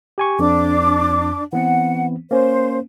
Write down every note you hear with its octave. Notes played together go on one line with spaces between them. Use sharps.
G4 G#5 C#6
F2 D4 D6
E3 B3 C4 F#5
A#3 C#4 C5